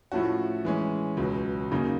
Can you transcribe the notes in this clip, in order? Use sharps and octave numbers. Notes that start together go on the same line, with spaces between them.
A2 F3 A3 C#4 F#4
E3 G#3 C#4
C#2 B2 F#3
F#2 C#3 F#3 A#3 D#4